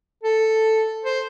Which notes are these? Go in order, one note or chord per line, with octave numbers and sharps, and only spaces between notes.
A4
C5